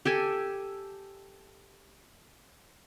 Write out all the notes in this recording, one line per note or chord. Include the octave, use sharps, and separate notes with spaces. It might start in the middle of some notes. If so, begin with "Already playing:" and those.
G4 A4 G#5